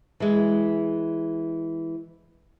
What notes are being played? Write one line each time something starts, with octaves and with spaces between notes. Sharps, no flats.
E3 G#3